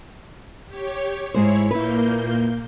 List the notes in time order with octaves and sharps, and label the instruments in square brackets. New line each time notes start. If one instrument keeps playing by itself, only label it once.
[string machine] G4 C#5
[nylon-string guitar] G#2 G#3 C5 [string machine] E4 C#5
[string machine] A#2 A#3 G6 [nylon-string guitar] E4 B4